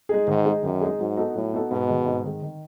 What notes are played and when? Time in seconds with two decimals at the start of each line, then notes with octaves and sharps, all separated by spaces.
0.09 G#3 D#4 G#4
0.27 G#2 D#3
0.45 G#3 D#4 G#4
0.63 F#2 D#3
0.81 G#3 D#4 G#4
0.99 G#2 F#3
1.17 B3 D#4 F#4 A4
1.35 A2 F#3
1.53 B3 D#4 F#4 A4
1.71 G#2 B2
1.89 D#3 G#3
2.06 G#2
2.24 D#3 G#3
2.43 D#3